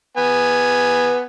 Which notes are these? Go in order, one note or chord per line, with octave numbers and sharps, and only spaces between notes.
B3 G#5